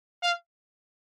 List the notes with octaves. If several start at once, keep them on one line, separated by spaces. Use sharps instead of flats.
F5